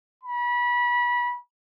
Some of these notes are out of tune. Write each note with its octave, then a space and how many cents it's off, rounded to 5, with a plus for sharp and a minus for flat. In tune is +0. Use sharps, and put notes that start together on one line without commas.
B5 -25